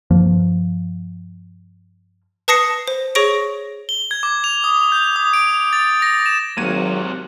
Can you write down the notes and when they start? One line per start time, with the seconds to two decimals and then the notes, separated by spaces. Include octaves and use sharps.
0.11 G2 F3 A#3
2.48 B4 A5 D#6 A#6 C7 C#7
2.88 C5
3.15 G#4 C#5 C#6 A#6 D7
3.89 G7
4.11 G#6
4.23 D6
4.44 F7
4.64 D#6
4.92 G6
5.16 D#6
5.33 D7
5.73 A6
6.02 A#6
6.26 E7
6.57 G#1 C3 F#3 A#3 F#4 G#6 D#7